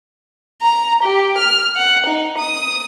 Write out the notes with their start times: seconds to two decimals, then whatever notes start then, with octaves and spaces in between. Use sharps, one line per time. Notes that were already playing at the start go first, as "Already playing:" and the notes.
0.62 A#5
1.03 G4
1.38 F6
1.76 F#5
2.06 D#4
2.38 D#6